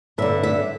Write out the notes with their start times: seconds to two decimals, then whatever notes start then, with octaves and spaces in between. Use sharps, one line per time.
0.18 G2 D3 E5
0.43 E5